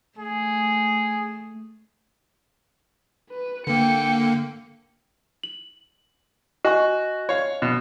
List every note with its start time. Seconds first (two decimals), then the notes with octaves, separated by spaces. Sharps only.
0.19 A3 G#4
3.30 B4
3.67 D3 A#3 G5 C#7
5.43 F#7
6.65 F#4 D#5 G#5 C#6
7.29 C#5 F5
7.62 B2